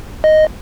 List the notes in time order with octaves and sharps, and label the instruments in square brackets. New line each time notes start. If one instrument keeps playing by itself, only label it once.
[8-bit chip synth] D#5